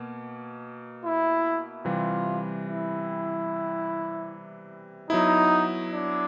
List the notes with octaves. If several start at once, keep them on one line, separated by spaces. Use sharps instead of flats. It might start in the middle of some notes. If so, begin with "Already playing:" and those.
Already playing: B2 A#3
E4
C3 E3 G3 F4
E4
F#3 B3 D#4 E4
D4